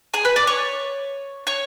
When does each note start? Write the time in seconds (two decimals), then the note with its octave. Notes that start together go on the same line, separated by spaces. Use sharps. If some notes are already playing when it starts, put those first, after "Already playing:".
0.14 G#4 G#5
0.25 B4 B5
0.36 D5 D6
0.47 C#5 C#6
1.47 C#5 C#6